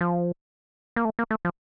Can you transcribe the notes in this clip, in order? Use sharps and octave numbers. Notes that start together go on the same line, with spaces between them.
F3
A#3
A3
A#3
A3
F3